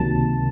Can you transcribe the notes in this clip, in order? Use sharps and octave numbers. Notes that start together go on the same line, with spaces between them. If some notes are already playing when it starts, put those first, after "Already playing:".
Already playing: C#2 C3 D#3 F#3 A#3 A5